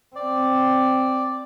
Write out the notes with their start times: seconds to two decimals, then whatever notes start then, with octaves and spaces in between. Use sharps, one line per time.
0.16 C4 D5